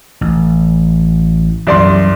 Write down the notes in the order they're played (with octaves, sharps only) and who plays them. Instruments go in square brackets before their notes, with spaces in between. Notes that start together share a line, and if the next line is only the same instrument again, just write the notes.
[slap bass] A1
[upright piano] C2 D5 C6 [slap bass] F#2 E3